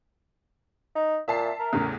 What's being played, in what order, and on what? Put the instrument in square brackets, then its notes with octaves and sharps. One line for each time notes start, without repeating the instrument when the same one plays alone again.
[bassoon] D#4
[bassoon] A#2 [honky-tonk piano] E5 A5 C7
[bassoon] A#4
[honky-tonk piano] E2 A2 C#3